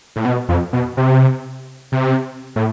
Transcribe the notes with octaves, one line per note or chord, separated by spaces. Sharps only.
A2
B2
F2
B2
C3
C3
A2